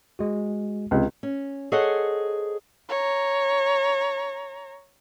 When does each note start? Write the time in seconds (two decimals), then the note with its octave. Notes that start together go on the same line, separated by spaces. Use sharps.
0.19 G#3 F#4
0.91 C#2 C3
1.23 C#4
1.72 G#4 A4 C5 C#5 D#5 F#5
2.89 C#5 A#5